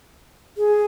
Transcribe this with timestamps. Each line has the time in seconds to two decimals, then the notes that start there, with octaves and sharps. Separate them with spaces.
0.57 G#4